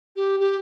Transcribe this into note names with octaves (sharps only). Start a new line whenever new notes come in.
G4
G4